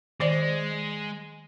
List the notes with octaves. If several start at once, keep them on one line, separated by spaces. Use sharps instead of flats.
D#3 G#3 C5 D5